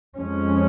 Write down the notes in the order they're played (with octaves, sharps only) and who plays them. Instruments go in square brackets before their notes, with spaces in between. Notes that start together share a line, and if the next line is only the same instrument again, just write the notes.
[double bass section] F2 F3 G#3 C#4